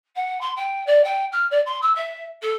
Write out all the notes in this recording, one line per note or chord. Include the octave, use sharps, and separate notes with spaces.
F#5
C6
G5
D5
G5
F6
D5
C6
E6
E5
A4